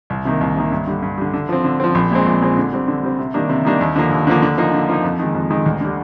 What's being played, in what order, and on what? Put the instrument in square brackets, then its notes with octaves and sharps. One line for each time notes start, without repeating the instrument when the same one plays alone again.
[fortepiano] C2
C3 D#3 A#3
C2
C3 D#3 A#3
G2
D3 G3
G2
D3 G3
D3
F3 C4
D3
F3 C4
A#1
A#2 G#3 C4
A#1
A#2 G#3 C4
D3
G3 C4
D3
G3 C4
C3
D#3 G3 A#3 D4
C3
D#3 G3 A#3 D4
D#2
D3 F3 A#3
D#2
D3 F3 A#3
D3
F3 A#3 D#4
D3
F3 A#3 D#4
F2
D#3 G#3
F2
D#3 G#3
D2
D3 G3